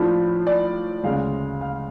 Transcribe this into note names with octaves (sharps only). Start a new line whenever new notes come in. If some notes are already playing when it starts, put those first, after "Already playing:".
Already playing: A2 F3 A3 D4 F4 B5
D5
D2 C#3 G#3 F5
F5